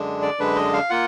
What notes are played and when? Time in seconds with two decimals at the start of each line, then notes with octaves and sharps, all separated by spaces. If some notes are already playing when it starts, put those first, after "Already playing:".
Already playing: F#2 D3 G#3 D4
0.22 D5
0.40 F#2 D3 G#3 D4 B4
0.56 D#5
0.73 F5
0.90 A#3 F4 F#5